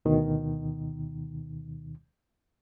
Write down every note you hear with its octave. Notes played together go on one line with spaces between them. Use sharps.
D2 B2 D#3